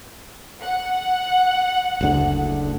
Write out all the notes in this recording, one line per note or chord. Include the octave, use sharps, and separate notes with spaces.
F#5
F#1 D2 D3